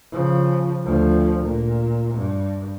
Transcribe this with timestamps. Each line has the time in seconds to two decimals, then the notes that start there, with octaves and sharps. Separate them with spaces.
0.12 C#3 F3
0.85 D2 F3
1.43 A#2
2.14 G2